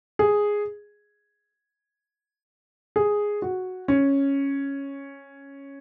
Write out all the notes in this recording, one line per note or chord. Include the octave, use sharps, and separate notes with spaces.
G#4
G#4
F#4
C#4